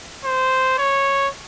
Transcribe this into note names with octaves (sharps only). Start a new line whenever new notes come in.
C5
C#5